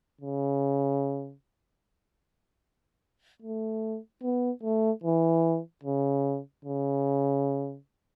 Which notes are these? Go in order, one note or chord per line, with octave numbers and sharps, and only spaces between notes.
C#3
A3
B3
A3
E3
C#3
C#3